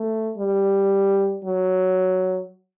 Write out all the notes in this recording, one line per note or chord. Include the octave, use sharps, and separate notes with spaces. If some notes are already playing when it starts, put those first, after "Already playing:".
Already playing: A3
G3
F#3